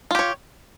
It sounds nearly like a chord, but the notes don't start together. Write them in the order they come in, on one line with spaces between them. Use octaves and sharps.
F4 G4 C#5